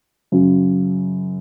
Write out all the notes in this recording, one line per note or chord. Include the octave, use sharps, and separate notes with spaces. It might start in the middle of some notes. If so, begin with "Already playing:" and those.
F#2 C#3 F#3